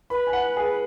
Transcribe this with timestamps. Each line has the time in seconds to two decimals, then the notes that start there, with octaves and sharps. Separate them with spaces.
0.10 B4 B5
0.27 G#5
0.33 F#5
0.57 G#4